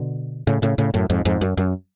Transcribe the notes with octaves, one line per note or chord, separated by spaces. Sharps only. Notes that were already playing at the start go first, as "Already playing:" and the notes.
Already playing: B2 D3
A2 C#3
A2 C#3
A2 C#3
F#2 A2
F2 G#2
F2 G#2
F#2
F#2